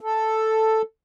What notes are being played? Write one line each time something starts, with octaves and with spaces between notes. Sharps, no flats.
A4